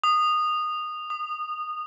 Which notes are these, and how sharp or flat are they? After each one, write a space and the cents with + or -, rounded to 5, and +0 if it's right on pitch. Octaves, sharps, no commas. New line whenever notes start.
D#6 -20
D#6 -35